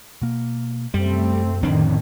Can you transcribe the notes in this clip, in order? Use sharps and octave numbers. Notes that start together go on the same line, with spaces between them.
B2 A#3
F#2 C3 G3 A3 C4
A1 F2 D3 D#3 C4 D4